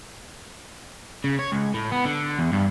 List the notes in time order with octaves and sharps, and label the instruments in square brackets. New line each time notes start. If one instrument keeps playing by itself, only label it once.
[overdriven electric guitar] C#3
C#5
C#2
A2
B3
D3
E2
G2